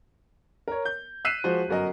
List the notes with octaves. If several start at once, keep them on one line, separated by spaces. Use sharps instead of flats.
A#4 C#5
G6
E6 F#6 B6 C7 D#7 E7
F3 G#3 F#4 C5
G1 F#2 F#4 A#4 D#5